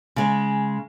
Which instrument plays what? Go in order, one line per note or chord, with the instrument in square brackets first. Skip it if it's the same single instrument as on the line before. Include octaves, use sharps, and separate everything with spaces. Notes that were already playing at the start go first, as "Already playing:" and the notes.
[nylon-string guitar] C#3 G#3